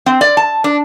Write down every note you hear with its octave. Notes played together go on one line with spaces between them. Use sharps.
C4
D5
A5
D4